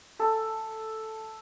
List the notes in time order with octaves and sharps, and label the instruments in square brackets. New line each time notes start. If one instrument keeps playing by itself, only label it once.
[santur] A4